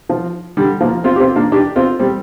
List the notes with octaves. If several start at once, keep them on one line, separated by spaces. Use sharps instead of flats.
F3
D3 G3
F3 A#3
C4 F4
G4
C4 F4
A#3 D4
D4 G4
C4 F4
G3 C4